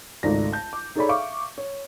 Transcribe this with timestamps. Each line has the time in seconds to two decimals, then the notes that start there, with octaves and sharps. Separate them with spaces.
0.23 G#1 C#2 A3 D#4 D5 A#6
0.52 A5 G6
0.73 D6
0.95 D#4 G#4 A4 C#5 D5 B5
1.09 E5 F5 C#6 D6
1.58 C#5